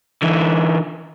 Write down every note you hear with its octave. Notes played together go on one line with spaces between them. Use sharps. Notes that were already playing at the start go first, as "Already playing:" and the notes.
D3 E3